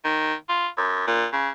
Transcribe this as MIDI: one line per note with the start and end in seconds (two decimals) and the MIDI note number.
0.04 0.34 51
0.49 0.67 65
0.78 1.06 42
1.07 1.27 46
1.33 1.50 49